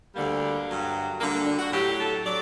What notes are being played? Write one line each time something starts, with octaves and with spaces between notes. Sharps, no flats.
D2 D3 G3 A#3
G2 F#3
D2 D3 G3 A#3
A#3
D4
F#4
A2 F#3 G4
A4
F#3 D5